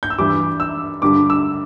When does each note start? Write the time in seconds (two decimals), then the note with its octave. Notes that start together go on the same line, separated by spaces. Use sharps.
0.03 G6
0.10 E6
0.19 G2 E3 G3 D6
0.60 E6
1.02 G2 D3 G3 D6
1.30 E6